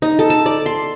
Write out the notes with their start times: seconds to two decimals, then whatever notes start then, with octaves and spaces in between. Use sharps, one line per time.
0.02 D#4
0.19 A4
0.30 A5
0.46 D5
0.66 C6